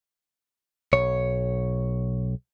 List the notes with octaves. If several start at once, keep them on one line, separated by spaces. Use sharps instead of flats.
B1 C#5